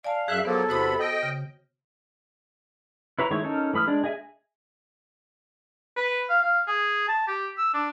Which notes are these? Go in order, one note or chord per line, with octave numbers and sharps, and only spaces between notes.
D5 F5 G#5 A5
F#2 G#4 E5 F#6 G6
F3 F#3 A#3 B3 A4
E2 C3 F#4 C5 B5 D#6
D#5 G5
C#3
E4 B4 C#5 A#5
D#3 G#3 A3 E4 C#5
C#4 D#4 A4 A#4
E3 A3 B5 D#6 F6
G#3 D4 D5
G#4 D#5 E5 G#5
B4
F5
F5
G#4
A5
G4
E6
D4